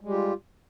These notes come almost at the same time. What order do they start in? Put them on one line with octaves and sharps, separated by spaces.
G#3 G3 G4 F4